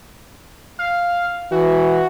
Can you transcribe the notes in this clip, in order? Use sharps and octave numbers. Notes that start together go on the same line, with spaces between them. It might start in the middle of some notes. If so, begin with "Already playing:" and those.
F5
E3 F#4